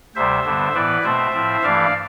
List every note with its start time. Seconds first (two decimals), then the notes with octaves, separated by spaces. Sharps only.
0.15 D2 C3 G3 C5 E5
0.45 G2 D3 G3 B3
0.74 A2 E3 B3 B4 D5
1.04 B2 A3 C4 C5 E5
1.33 A2 F3 C4
1.62 G2 E3 A3 D5 F5